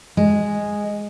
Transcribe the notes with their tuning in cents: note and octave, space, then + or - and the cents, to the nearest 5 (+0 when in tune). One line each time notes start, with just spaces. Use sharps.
G#3 -5